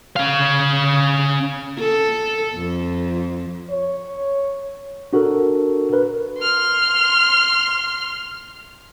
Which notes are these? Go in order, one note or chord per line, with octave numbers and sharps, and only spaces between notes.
C#4 F5
A4
F2
C#5
D4 F#4 A4 A#4
A#4 B4
C6 F6